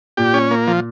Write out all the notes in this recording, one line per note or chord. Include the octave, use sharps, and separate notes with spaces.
A#2 G4
C#4
A#3
F3